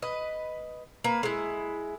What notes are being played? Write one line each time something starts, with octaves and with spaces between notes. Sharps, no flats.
B4 D#5
A#3 B4
G#3 E4